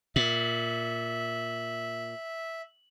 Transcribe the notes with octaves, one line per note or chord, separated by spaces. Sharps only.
A#2 E5 F#7